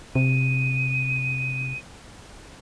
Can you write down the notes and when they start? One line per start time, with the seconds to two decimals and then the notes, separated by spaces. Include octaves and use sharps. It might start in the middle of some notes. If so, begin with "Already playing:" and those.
0.15 C3 D#7